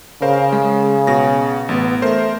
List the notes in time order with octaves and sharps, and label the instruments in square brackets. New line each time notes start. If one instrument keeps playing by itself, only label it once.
[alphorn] C#3 [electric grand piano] A#4 C5 F5
[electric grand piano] G#3
B2 A#6
A1 B3
[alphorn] A3 [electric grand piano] A#4 C5 C6